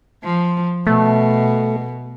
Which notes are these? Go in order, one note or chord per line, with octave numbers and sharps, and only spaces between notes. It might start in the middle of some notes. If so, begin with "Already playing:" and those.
F3
B2 A3